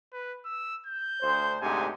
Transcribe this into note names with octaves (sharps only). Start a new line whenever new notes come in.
B4
E6
G6
D2 C5
D2 G#2 C3 G#5